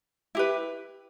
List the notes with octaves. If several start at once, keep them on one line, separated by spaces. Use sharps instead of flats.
E4 G4 B4